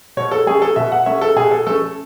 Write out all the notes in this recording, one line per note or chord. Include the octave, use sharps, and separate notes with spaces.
B2 C#5
A4
A3 C#4 G#4
A4
B2 E5
F#5
A3 C#4 E5
A4
B2 G#4
A4
A3 C#4 A4